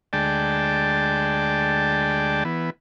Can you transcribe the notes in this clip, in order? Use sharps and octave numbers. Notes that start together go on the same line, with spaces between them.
D2 G#3 D5 G5 A5
E3 B3